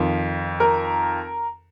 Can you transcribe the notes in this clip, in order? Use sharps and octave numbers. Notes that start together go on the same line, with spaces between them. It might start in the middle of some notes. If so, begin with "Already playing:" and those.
Already playing: F2 D#3 F4
A#4